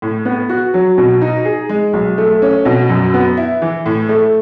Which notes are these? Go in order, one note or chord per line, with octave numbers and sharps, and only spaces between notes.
A2
B3
F#4
F#3
B2
D#4
G#4
G#3
B1
A3
C#4
B2
F#2
B3
E4
E3
A2
A3